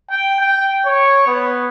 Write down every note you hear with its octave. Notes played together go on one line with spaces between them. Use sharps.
G5
G5
C#5
B3